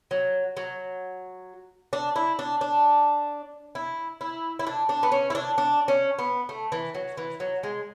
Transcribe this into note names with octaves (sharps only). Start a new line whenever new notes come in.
F#3
F#3
D4
E4
D4
D4
E4
E4
E4
D4
D4
B3
C#4
E4
D4
D4
C#4
B3
A3
E3
F#3
E3
F#3
G#3